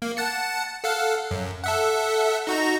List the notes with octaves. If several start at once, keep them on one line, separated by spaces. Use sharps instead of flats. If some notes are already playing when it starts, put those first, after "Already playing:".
A#3
F#5 A5 C#7
A4 F5 F#5
F#2
A4 E5 F#5
D#4 F#4 A#5